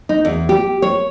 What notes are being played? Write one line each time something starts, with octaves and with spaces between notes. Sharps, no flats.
D#4
E2
G4
C#5